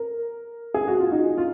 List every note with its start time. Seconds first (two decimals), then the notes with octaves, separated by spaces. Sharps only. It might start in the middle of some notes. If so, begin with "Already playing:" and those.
Already playing: A#4
0.74 G#4
0.87 F#4
1.00 F4
1.12 D#4
1.37 F4